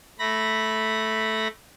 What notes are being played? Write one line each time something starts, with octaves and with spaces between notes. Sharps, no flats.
A3 B5 A#6